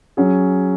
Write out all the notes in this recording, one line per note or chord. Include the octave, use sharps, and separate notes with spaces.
F#3 C#4 G#4